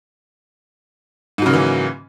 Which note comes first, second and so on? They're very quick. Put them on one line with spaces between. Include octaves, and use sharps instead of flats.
G#2 F#3 C#3 A#3 E3